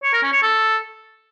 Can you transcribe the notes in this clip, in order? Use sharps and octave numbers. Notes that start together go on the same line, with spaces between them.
C#5
A#4
C#4
C#5
A4